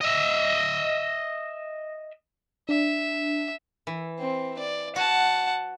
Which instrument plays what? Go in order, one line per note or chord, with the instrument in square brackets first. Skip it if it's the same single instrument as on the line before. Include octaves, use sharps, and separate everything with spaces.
[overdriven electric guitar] D#5 E5
[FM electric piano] D4 [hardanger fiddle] E5
[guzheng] E3
[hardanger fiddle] C4
D5
[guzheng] F#4 [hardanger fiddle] F#5 A5